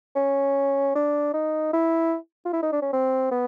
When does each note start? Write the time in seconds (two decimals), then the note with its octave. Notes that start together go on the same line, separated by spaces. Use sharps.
0.16 C#4
0.95 D4
1.34 D#4
1.73 E4
2.45 F4
2.53 E4
2.62 D#4
2.73 D4
2.82 C#4
2.93 C4
3.31 B3